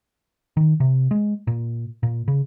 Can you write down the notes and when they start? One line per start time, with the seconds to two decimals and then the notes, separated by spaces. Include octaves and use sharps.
0.57 D#3
0.80 C3
1.11 G#3
1.47 A#2
2.03 A#2
2.28 C#3